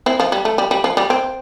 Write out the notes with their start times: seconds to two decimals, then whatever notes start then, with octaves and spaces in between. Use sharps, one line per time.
0.06 C4 E4
0.20 F3
0.32 G3
0.45 A3
0.58 G3
0.71 G3
0.84 F3
0.97 G3
1.10 C4